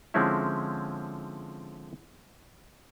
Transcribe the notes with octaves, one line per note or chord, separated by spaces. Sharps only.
D3 F3 G#3 C4 C#4 E4